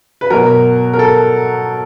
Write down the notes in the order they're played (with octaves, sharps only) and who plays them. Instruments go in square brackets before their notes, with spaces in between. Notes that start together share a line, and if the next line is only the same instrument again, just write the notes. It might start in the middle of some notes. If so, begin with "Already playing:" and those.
[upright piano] B4
B2 F#3 A#4
A#4
A4